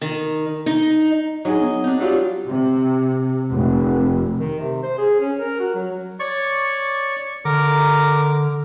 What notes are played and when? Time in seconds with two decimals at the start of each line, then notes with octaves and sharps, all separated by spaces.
0.01 D#3
0.66 D#4
1.45 F#3 D#4 G#4 D#5
1.61 B3
1.84 C4 D4 D#4
2.00 F#3 G3 F4 G4
2.46 C3
3.54 F1
4.40 D#3
4.59 C3
4.83 C5
4.98 G#4
5.20 C#4
5.39 A#4
5.60 F#4
5.75 F#3
6.20 C#5 D5 C#6
7.45 D3 A#4 A#5 D6